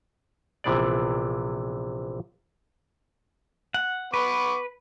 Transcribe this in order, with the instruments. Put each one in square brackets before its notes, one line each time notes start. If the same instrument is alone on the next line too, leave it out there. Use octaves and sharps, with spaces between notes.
[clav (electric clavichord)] A#1 C3 E3 B3 G#4 D5
[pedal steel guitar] F#5
[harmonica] B3 C#6 D6 [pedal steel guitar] B4